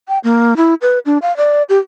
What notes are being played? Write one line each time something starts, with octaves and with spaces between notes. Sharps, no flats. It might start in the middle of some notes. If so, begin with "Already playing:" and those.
G5
A#3
E4
B4
D4
F5
D5
G4